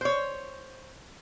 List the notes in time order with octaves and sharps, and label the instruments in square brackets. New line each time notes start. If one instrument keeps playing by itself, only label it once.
[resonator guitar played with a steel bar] C5 C#5